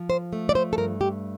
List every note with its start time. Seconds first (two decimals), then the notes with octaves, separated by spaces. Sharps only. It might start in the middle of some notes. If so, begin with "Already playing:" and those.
Already playing: F3
0.10 C5
0.33 A3
0.49 D5
0.55 C5
0.73 A4
0.78 G2 A#4
1.01 G4